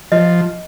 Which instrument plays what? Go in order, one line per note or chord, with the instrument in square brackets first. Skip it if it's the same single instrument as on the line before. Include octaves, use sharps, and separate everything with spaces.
[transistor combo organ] F3 [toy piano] D#5